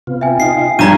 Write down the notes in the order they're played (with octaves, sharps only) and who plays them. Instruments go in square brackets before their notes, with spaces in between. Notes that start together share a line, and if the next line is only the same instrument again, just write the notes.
[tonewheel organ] C3 B3 F4
[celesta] E5 G5 G#5
[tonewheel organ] D#4 F4 [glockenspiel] C7
[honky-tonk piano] G2 G3 [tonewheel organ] F3 G5 G#6 [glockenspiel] A#5 D#7